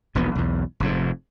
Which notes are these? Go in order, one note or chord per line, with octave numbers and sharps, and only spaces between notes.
E1 A#1 D#2 B3
B1 E2
F1 F2 G#2